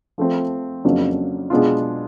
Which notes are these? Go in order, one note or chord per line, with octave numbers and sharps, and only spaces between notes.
F3 A3 C4
F2 C#3 F#3 A#3 D4
B2 G#3 B3 D4 F4